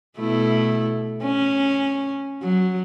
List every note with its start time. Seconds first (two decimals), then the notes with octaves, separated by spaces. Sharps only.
0.19 B2 A3 E4
1.23 C#4
2.42 F#3